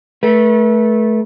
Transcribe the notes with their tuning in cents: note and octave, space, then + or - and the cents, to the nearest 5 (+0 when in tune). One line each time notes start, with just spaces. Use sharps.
A3 -15 B4 -40